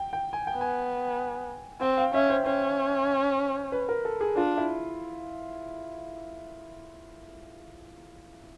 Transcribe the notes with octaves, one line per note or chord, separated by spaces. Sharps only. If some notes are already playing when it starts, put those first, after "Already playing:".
Already playing: G5
G5
G#5
G5
B3
G#5
C4 G5
F5
C#4 E5
C5
C#4 C5
B4
A#4
A4
G#4
D4 F4
E4